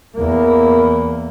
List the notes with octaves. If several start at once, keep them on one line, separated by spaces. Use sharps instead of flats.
E2 A#3